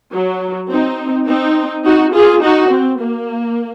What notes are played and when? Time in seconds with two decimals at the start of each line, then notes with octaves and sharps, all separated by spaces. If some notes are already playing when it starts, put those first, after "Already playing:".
0.12 F#3
0.70 C4 D#4
1.27 C4 D#4
1.84 D#4 F#4
2.13 F4 G#4
2.42 D#4 F#4
2.71 C4
3.00 A#3